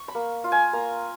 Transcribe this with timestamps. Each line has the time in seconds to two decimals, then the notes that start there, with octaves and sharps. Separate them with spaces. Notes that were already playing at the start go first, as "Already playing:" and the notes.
Already playing: C#6
0.08 B5
0.15 A#3
0.44 F4
0.52 G#5
0.73 A#3 A#5